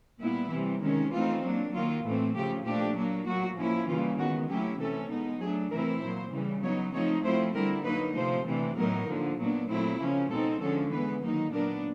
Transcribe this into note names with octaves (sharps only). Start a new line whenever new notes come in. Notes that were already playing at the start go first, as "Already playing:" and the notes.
A#2 G3 B3 E4
C3 E3 G3
C3 D#3 G#3 C#4
E3 A3 C4 D#4 F4
F#3 A#3 D4
D#3 F#3 A#3 F4
A2 E3 A3 C4
C#3 F3 A3 G4
A#2 F3 A3 D4 G4
F#3 A#3 D4
A2 F#3 A#3 F#4
F3 A#3 C#4 E4
C#3 E3 G3 A#3 F4
D#3 G#3 B3 F#4
F#3 A3 C#4 E4 G4
C3 E3 A3 C#4 A4
B2 G#3 B3 D#4
F#3 A3 D4 G#4
C3 E3 A3 C4 E4 A#4
A#2 F#3 A#3 C5
C#3 E3 G3
F#3 B3 D#4 C#5
F3 A3 C4 D#4 C#5
F3 A3 C4 E4 C5
D3 G3 C4 E4 A#4
F#3 A#3 D#4 B4
C3 F3 A3 C5
C3 E3 A3 D4
A2 F#3 B3 D#4 A#4
D3 F3 A#3
A#2 F#3 B3 D4
A#2 F#3 A3 C4 E4
C#3 F3 A#3 C#4
B2 G#3 C4 D#4 A4
D3 F3 G#3 C#4 A4
E3 G#3 B3 B4
D#3 F#3 A#3 D#4
A#2 F#3 B3 D4 A#4